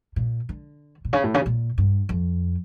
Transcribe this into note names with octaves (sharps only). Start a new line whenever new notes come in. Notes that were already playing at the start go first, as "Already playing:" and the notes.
A#2
D3
A#2
C#3
A2
C#3
A#2
G2
F2